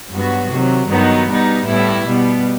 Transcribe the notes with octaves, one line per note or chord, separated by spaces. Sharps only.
G2 F#3 B3 F#4
C3 D#3 F#3
G2 D#3 F#3 B3 D#4
B2 G3 B3 D#4
A2 G3 B3 E4
B2 G3 B3